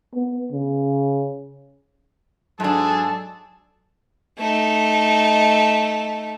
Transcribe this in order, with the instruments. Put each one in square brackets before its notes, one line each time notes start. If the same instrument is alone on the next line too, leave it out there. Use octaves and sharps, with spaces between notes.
[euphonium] B3
C#3
[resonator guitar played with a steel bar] G#2 D4 [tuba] F#3 [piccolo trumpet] G#4 [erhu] A4
[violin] A3 D#4